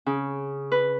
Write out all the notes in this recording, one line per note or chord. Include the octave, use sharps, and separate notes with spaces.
C#3
B4